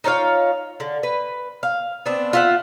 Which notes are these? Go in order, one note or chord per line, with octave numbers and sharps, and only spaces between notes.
D#4 F4 C#5 F5
D3
B4
F5
B3 C4 D4
F4 E5 F#5